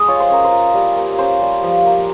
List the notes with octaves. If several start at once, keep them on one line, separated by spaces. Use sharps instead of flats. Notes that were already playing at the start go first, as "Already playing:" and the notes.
Already playing: G#3 D#5
F4 C#5
C5
C#4 A#4
C5
F4
G3
A#3
C#4 C5
G3
F3
A#3